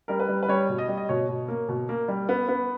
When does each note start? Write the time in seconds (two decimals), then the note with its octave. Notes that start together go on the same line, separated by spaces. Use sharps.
0.08 G3 A#4
0.20 B4
0.29 G3
0.43 B4
0.49 G3 C#5
0.69 B2
0.78 D#5
0.88 G3
0.97 D#5
1.09 B2 C#5
1.29 B2
1.48 A#3
1.68 B2
1.89 A#3
2.08 G3
2.29 B3
2.48 B3